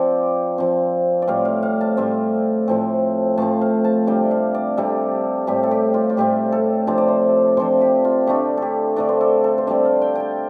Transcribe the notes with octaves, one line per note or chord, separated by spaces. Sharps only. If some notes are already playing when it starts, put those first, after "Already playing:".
Already playing: F3 C4 D5
F3 C4
D5
A2 G3 C4 F5
F5
F5
A5
A2 G3 C4
A2 F3 C4
A2 F3 C4 A5
F5
A5
C3 G3 D4 G5
F5
D5
C3 G3 D4 A4
A2 G3 C4 G4
A4
G4
F4
F4
A2 G3 C4 G4
A4
C3 F3 D4 C5
D5
C5
C3 F3 D4 C5
G4
F4
D3 A3 D4 G4
G4 A4
D3 A3 D4 D5
C5
A4
A4
C5
D3 G3 C4 D5
F5
G5
G5 A5